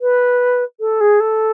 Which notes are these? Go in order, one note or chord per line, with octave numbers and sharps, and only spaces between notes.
B4
A4
G#4
A4